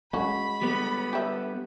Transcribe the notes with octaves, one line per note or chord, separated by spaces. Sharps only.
G#3 C#4 F#4 B5
G3 B3
G4 E5